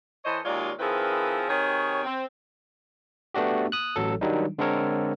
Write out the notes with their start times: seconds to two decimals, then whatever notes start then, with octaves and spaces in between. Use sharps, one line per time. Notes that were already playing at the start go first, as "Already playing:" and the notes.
0.25 E3 A4 C5 C#5 D#5
0.44 D#2 F#3 G#3 F4 D5
0.79 D#3 F3 C4 E4 G#4 B4
1.49 C3 D#3 G#4 C#5
2.03 C4
3.34 A3 B3 D4 F#4 G4
3.72 D#6 F#6
3.96 A1 F#3 A4
4.21 D#3 F#3 G3 D4 D#4
4.59 D3 G#3 C4 A4 A#4 C#5